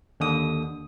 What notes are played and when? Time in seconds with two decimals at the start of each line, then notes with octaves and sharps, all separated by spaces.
0.20 D#2 D3 D#6